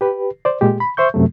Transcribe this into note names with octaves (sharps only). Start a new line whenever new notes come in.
G4 B4
C5 D5
A#2 G#3 G4
B5
C5 E5 C#6 G6
F#2 C3 F#3 A3